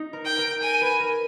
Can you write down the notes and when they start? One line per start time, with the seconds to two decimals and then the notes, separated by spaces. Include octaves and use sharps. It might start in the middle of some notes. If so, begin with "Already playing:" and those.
Already playing: D#4
0.13 A#4
0.25 G5
0.38 A#4
0.63 G#5
0.81 B4
1.00 A#4